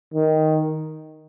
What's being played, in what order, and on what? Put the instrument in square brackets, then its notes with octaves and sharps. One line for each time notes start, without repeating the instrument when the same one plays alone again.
[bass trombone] D#3